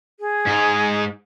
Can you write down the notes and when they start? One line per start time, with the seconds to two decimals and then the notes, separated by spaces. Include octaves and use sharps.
0.19 G#4
0.46 G#2 D#4